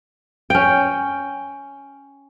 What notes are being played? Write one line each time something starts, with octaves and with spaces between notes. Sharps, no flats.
C#4 G5